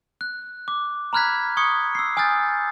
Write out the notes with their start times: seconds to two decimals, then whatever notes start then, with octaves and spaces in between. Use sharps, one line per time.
0.21 F#6
0.68 D6
1.13 A#5 B5 F6 F#6 G#6 B6
1.57 C#6 D#6 G#6 C#7
1.95 E6 C7
2.17 G#5 D#6 F6 G6 A6